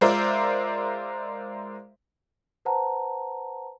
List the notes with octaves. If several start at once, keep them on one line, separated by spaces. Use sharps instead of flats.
G#3 F4 A#4 C5 D5 E5
B4 C5 F#5 A5 A#5